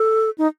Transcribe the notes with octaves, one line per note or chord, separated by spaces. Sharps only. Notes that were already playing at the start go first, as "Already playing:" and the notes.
Already playing: A4
D#4